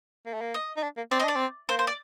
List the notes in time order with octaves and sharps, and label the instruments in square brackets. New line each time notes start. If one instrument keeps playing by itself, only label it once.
[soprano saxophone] A#3
A3
A#3
[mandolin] D#5
[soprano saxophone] D#4
D4
A#3
[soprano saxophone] C4 [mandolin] D5
[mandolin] D#5
[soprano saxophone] D4 [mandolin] D5
[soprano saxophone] C4
[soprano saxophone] A#3 [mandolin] C5
[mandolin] C5
D5